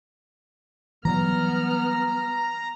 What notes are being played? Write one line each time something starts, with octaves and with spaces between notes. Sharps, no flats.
E3 F#3 G3 B3 A#5 F6